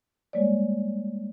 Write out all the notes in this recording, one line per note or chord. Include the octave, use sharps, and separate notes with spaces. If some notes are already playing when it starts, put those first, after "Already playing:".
G3 G#3 A#3 C#5 D5